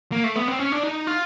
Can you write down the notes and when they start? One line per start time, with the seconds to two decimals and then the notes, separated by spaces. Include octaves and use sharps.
0.12 A#3
0.24 A3
0.36 B3
0.48 C4
0.59 C#4
0.72 D4
0.83 D#4
1.07 F4